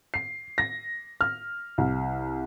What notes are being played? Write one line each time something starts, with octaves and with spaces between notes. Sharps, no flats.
C7
A#6
F6
C2